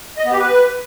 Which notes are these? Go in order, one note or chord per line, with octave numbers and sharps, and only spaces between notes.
D#5
B3
G4
B4